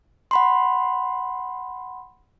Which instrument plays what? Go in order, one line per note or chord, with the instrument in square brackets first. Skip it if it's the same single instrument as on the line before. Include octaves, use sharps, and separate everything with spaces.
[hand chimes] F#5 B5 C6